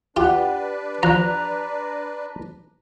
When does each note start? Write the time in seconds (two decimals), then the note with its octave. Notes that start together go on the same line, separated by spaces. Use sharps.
0.17 D4 F4 G4 B4 F#5
1.03 F3 A#5 F#6